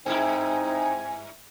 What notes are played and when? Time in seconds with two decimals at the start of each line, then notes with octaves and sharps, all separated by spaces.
0.06 G2 C4 D#4 E4 G#5